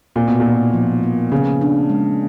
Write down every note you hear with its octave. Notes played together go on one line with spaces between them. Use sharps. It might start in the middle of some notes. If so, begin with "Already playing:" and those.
A#2 C4
B2
A#2
D#4
F3
A#3
C#3 B3
D4
G#3